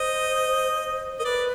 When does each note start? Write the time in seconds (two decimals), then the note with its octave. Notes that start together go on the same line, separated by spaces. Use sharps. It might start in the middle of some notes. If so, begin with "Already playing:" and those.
Already playing: C5 D#5
1.19 A#4 D#5
1.24 B4 D5